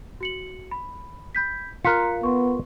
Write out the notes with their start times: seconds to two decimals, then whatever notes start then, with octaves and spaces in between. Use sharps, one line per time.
0.21 F#4 C#7 F#7
0.71 B5
1.35 B5 G6 B6
1.85 F4 A#4 F#6 B6 C#7
2.23 B3 C6 C#6